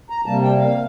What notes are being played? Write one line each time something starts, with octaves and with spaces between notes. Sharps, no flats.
A#5
C3 G3 A#3 A5
G5
F5